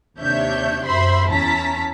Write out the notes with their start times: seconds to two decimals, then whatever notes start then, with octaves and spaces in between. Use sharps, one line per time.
0.19 D#2 C3 D4 C#5 E5 G6
0.85 F#2 C5 E5 B5 C6
1.31 E2 C#4 E4 A5 A#5 B6